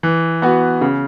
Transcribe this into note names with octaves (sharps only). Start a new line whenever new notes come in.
E3
B3 F#4
C#3